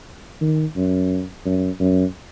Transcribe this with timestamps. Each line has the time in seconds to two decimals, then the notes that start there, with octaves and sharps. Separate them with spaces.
0.41 D#3
0.76 F#2
1.45 F#2
1.80 F#2